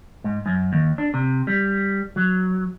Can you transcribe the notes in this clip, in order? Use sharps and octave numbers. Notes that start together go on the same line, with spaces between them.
G#2
F#2
D#2
D4
C3
G3
F#3